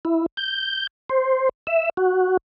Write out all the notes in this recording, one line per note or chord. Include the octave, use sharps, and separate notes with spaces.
E4
G6
C5
E5
F#4